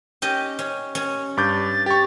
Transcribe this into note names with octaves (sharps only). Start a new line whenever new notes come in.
C#4 G4 D#5
C#4
C#4
G2 D6 G6 A6
G4 C#6